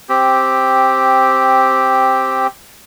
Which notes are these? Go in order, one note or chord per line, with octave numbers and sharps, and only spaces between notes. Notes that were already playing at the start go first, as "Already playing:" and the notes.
C4 G4